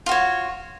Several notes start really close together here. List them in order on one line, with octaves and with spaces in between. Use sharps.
F4 F#4 C#5